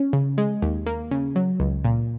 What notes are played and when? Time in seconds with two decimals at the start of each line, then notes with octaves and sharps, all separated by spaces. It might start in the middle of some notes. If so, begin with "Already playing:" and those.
Already playing: C#4
0.13 C#3
0.38 G#3
0.62 D#2
0.86 A#3
1.11 C#3
1.36 F#3
1.60 C#2
1.84 A#2